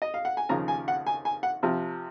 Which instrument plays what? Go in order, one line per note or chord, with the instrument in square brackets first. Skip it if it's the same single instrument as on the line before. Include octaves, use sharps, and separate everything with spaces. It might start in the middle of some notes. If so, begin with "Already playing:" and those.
[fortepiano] D#5
F5
F#5
G#5
D#2 C#3 F3 A#5
G#5
F#5
G#5
G#5
F#5
C3 F3